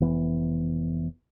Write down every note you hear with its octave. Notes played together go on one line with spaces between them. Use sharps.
F1 E3 B3